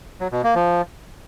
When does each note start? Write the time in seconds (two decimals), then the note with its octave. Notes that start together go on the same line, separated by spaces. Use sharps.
0.20 F#3
0.32 B2
0.44 A#3
0.55 F3